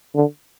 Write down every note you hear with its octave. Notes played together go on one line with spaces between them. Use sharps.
D3